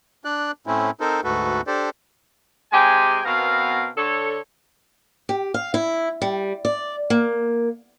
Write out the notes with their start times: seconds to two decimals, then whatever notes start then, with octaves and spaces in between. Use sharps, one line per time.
0.25 D4 D5 F#6
0.67 A2 A3 C4 C#4 E4
1.00 C4 D#4 A4 A#4 C5
1.24 D2 G#2 A3 F#4 A4 B4
1.67 D4 G4 A4 C5 D5
2.72 C3 G#3 G4 G5 G#5
3.25 B2 B3 C4 A#4 F5 A#5
3.96 D3 A4 C#5
5.29 G4
5.54 F5
5.74 E4
6.22 G3
6.65 D5
7.10 A#3